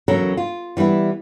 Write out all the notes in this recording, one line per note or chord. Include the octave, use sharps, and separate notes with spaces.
E2 C#3 F#3 C#4 A4 A#4
F4
E3 G3 B3 E4